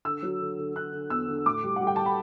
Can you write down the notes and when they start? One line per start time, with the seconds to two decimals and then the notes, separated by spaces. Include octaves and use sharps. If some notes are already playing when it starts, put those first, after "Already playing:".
0.05 D3 E6
0.23 F#3
0.41 D3
0.58 D3
0.75 D3 F#6
0.93 D3
1.10 E2 E6
1.28 D3
1.45 A2 D6
1.64 G3
1.76 G3 F#5
1.87 G5
1.96 A5
2.06 B5